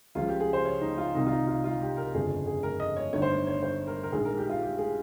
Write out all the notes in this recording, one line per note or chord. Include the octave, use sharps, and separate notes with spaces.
C#2 C#3 F3 F4
G4
G#4
C5
C#5
D#4
F4
C2 C3 D#3 D#4
F4
D#4
F4
F4
G4
A#4
G1 F2 C#3 F3 G#4
G#4
A#4
D#5
C#5
G1 G2 D#3 C#5
C5
C#5
C#5
C5
A#4
A#4
A#1 G#2 D#3 G#4
A#4
G4
F4
G4
G#4